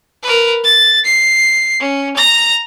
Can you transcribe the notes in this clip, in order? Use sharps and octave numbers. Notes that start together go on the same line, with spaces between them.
A#4 B4
A6
C7
C#4
A#5 A#6